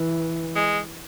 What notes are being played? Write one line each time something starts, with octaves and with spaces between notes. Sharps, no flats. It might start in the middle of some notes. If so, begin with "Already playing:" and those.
Already playing: E3
G#3